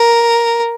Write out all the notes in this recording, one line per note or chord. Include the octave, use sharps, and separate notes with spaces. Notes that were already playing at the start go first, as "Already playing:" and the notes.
Already playing: A#4